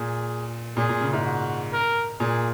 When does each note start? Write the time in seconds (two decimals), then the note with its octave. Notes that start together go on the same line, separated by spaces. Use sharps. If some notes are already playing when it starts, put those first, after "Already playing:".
Already playing: A#2 G#4
0.76 A#2 G#4
0.89 A#2
1.01 C#3
1.13 G#2
1.25 F#4
1.73 A#4
2.20 A#2 G#4